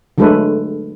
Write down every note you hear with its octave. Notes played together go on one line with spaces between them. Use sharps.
D3 F#3 G#3 A3 A4 B4